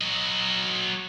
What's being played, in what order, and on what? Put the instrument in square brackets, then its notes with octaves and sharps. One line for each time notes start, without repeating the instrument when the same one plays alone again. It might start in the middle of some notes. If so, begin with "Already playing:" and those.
[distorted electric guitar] F#3 D#5